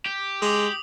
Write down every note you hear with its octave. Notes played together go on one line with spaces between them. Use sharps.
G4
G#3 D6 D#6